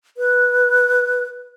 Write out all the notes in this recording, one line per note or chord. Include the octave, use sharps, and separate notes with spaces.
B4